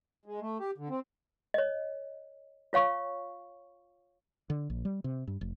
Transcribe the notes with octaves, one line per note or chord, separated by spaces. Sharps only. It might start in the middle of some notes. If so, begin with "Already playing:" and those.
G#3
A3
G4
D3
C4
C#5 D#5
F4 C#5 F5 C#6
D3
A#1
G3
C3
G2
F1